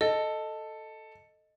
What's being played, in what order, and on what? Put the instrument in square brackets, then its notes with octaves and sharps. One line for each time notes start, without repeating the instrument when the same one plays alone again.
[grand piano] A4 [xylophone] D#5